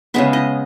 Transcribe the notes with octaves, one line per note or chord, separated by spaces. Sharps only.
C#3 G#3 B3 E5
D#5